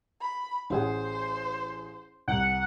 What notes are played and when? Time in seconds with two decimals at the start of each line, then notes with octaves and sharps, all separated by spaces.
0.21 B5
0.70 A1 G#4 C5 F#5
2.28 C2 F#5